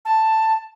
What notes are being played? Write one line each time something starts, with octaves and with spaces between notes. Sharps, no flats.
A5